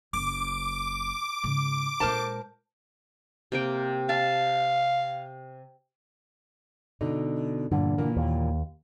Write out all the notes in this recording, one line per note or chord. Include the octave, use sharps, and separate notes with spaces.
F#1 D6
G#2 C#3
A#2 G#3 A#4 C5 A5
C3 A#3 G5
F5 A5
B2 D3 D#4
E2 G2 A#2 D3
A#2 E3 A#3
D#2